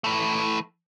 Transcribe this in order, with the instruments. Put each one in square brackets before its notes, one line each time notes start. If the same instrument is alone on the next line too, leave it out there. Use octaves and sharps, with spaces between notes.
[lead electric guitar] E3 A3